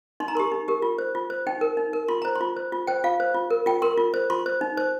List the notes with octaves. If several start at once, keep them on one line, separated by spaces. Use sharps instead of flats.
D#4 C6
A#5
G4 A#4 C6
D#4
G4 A#4
F4
C5
F4
C5
D#4 G5
A#4
D#4
A#4
F4 C6
C5 A#5
C6
F4
C5
F4
C5 G5
F4 F5
C5
F4
A#4
F4 G5
A#4 C6
F4
C5
F4 C6
C5
D#4
C5